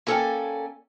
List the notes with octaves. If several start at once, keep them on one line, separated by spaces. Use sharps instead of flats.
A#3 C#4 A4 D5 G5 G#5